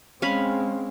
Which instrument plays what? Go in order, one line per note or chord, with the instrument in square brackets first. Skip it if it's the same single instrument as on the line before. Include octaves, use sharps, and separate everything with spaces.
[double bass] G#3 C4 [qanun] C#4 F5 B5